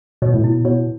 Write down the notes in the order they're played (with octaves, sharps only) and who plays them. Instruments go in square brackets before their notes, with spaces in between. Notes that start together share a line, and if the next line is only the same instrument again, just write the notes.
[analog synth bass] B2 [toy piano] C#5
[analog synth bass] A2
[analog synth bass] B2 [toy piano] E4
[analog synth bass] B2 [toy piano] C#5